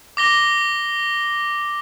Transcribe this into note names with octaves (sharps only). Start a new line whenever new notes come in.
D6 A#6 G7